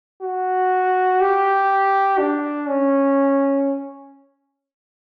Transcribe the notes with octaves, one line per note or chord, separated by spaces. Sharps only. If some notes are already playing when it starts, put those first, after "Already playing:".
F#4
G4
D4
C#4